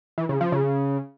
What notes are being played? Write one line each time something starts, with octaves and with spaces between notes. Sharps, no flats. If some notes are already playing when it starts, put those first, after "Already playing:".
E3
C#3
F3
C#3